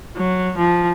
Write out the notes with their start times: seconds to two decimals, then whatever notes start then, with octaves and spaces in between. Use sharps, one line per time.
0.16 F#3
0.58 F3